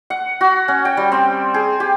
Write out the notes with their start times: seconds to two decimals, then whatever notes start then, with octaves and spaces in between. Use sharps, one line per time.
0.10 F#5
0.41 F#4
0.68 C#4
0.85 G5
0.97 G3
1.12 C4
1.54 G#4
1.80 G4